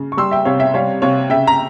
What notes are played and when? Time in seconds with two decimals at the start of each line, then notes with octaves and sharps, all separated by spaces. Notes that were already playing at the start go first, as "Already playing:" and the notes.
Already playing: C#3
0.12 C#6
0.17 G3 C6 E6
0.31 E5 G5
0.45 C3 C#5 F5
0.59 E5 G5
0.74 G3 C#5 F5
1.02 C3 C#5 F5
1.30 C#3 E5 G5
1.47 A#5